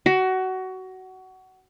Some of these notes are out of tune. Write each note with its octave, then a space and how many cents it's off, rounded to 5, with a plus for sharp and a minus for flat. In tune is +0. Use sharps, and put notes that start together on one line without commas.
F#4 +20